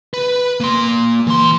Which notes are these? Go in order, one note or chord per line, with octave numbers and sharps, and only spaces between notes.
B4
A#3 C6
E3 C6